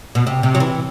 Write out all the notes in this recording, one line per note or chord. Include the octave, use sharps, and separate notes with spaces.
B2
C3
C3
F#3
E3